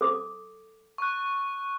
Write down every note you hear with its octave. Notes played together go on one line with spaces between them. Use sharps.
A4 D6
C#6 F#6